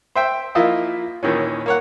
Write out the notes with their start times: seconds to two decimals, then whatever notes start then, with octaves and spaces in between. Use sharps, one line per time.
0.15 C5 E5 G5
0.55 F3 A#3 E4 F4 D#5 E5
1.23 D#2 A#2 D#3 E3 C#4
1.66 A#3 C#5 F#5